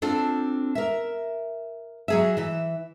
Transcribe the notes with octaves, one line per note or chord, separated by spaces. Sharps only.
C4 D4 F4 A4
A#4 E5
F#3 G#4 E5
E3 E5